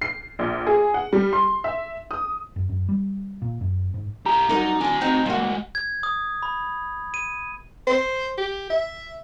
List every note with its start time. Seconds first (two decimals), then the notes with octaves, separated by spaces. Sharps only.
0.01 C7
0.39 A#1
0.67 G#4
0.94 F#5
1.13 G3
1.33 C6
1.64 E5
2.11 D#6
2.56 F#2
2.69 F#2
2.89 G3
3.42 A#2
3.61 F#2
3.94 G#2
4.26 E4 G4 A#5
4.49 G2 F#3 D#4 A#4 D5 F#5
4.81 D3 F#3 A3 D5 G#5 A5
5.01 C4 D#4 F4 F#4 G5
5.26 G2 G3 G#3 A#3 F4 F#4
5.75 G#6
6.03 D#6
6.43 B5
7.14 D#7
7.87 C5
8.38 G4
8.70 E5